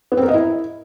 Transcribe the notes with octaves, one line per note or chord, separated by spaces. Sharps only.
B3
C4
A#4
D#5
E4